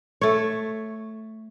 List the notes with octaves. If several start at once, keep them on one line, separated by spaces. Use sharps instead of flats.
A3 C#5